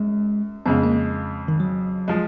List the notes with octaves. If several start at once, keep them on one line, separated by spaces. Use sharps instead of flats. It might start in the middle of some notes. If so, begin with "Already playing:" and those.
Already playing: F#2 G#3
F2 C#3 G#3 B3
A#3
D#3
F#3
F3 G#3